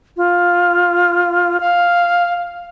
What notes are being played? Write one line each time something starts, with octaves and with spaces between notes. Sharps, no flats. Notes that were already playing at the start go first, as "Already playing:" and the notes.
F4
F5